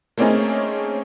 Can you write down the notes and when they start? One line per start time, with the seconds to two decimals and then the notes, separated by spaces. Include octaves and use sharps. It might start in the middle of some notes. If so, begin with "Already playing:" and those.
0.18 A3 A#3 C4 C#4 D#4 G#4